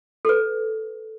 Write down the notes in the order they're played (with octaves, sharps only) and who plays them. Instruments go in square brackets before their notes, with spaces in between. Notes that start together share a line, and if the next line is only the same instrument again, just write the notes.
[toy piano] A4 B4